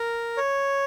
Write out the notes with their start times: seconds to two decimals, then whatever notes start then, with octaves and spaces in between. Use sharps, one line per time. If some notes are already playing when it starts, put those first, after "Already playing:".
Already playing: A#4
0.37 C#5